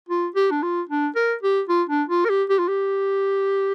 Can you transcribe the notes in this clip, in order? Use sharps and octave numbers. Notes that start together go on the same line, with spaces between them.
F4
G4
D4
F4
D4
A#4
G4
F4
D4
F4
A#4
G4
G4
F4
G4